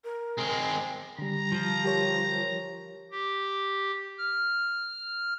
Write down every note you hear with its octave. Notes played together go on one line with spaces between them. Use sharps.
A#4
G#3 C4
D3 G3 A#5
F3
G4 A#4 C#5
G4
F6